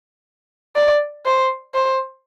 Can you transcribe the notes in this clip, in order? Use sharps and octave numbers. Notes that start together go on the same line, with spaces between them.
D5
C5
C5